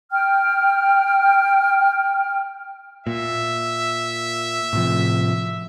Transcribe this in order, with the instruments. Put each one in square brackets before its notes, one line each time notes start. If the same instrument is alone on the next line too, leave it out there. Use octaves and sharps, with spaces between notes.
[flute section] G5 F6
[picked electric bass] A#2 [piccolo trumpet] E5
[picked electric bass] A2 C3 F3